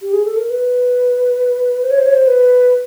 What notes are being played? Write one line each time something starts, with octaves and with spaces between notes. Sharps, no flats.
G4
G#4
A4
A#4
B4
C5
C#5
C5
C#5
C5
B4